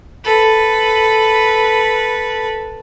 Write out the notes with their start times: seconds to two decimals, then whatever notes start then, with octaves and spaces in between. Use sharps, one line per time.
0.24 A4 B4